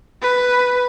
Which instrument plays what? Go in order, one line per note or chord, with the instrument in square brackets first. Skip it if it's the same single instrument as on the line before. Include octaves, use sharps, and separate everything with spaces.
[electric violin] B4